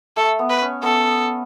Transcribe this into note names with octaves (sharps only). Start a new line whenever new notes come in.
A3 A4
B3
B4
C#4
B3 A4